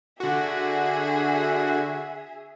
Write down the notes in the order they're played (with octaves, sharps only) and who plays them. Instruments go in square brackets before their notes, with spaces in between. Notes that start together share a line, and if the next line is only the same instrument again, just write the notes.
[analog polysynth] D3 F#4 [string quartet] G#4 E5